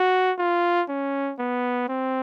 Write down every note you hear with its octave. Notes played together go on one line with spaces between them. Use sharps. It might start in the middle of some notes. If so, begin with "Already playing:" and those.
Already playing: F#4
F4
C#4
B3
C4